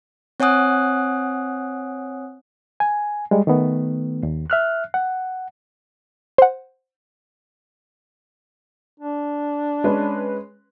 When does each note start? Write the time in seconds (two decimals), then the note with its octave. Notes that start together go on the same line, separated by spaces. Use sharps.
0.40 C4 C#5 F#5 G#5 D#6 F#6
2.80 G#5
3.31 G3 G#3
3.47 D#3 A3 B3
4.23 D#2
4.50 E5 F6 F#6
4.94 F#5
6.38 C5 F#5
9.00 D4
9.84 G#3 C#4 B4